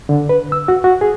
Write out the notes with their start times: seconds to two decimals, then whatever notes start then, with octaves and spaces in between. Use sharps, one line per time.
0.09 D3
0.29 B4
0.52 E6
0.68 F#4
0.84 F#4
1.01 G#4